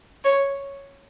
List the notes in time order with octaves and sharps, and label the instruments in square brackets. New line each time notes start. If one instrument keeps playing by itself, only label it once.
[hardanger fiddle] C#5